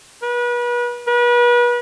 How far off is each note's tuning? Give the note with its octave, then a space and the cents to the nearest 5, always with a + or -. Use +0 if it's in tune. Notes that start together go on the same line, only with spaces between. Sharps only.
B4 -35
B4 -35